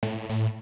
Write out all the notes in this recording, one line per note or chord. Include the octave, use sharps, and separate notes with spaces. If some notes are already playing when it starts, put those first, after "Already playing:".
A2
A2